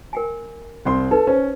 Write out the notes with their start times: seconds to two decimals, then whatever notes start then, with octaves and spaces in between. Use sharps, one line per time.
0.13 A#4 G5 G#5
0.85 C2 C4 C6
1.11 D#4 A4 B4
1.27 C#4 C5